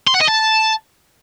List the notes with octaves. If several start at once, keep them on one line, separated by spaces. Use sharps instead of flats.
C6
F#5
D#5
A5